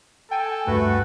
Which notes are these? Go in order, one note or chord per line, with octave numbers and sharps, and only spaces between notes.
A4 G5 G#5
D2 G2 A3 F#4 B4